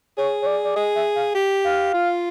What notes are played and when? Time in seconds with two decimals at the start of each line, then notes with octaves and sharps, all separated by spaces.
0.17 G#4 C#5
0.42 C#5
0.46 D5
0.64 D5
0.76 G#4 D#5
0.95 E5
1.16 F5
1.35 G4
1.64 F5
1.94 F4